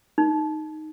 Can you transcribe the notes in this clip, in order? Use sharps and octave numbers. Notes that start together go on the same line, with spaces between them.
D#4